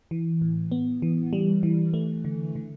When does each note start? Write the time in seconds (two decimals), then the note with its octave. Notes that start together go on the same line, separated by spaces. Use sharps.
0.11 E3
0.41 A2
0.72 B3
1.02 E3
1.33 G3
1.63 E3
1.94 A3
2.25 D3
2.56 D3